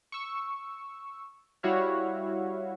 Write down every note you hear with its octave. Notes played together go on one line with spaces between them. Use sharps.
C#6 E6
G3 E4 F#4 C#5 E5 F5